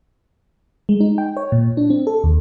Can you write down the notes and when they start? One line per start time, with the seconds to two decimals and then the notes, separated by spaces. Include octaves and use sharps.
0.89 G#3
1.00 D#4
1.18 G5
1.37 C#5
1.52 A#2
1.77 D4
1.90 C4
2.07 A4
2.24 D#2